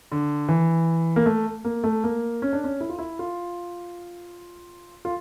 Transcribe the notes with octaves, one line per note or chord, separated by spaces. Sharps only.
D3
E3
A#3
A3
A#3
A3
A#3
C#4
D4
C#4
E4
F4
E4
F4
F4